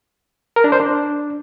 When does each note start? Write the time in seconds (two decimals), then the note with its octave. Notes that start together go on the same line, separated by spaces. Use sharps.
0.56 A#4
0.64 D4
0.72 C5
0.80 D4